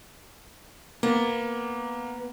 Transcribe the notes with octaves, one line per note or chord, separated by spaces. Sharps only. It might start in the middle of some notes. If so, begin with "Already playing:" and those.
A#3 B3